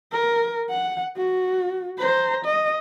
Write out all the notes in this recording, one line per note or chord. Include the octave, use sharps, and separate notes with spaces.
A#4
F#5
F#4
C5 A#5
D#5